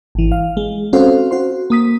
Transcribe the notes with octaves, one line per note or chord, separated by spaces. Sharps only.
G#1 E3
F5
G#3
C4 C#4 F#4 A4 C5 F5
F#4 C5 C6
A#3 D#6 B6